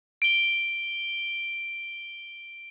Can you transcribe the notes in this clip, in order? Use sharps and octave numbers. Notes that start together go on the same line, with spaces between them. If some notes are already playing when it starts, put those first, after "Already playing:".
D7 G7